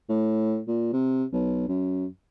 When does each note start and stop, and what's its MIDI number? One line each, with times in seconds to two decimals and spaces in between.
0.09 0.61 45
0.68 0.90 46
0.93 1.24 48
1.32 1.67 35
1.68 2.07 42